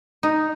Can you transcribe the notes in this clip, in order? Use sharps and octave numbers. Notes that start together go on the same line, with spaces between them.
D#4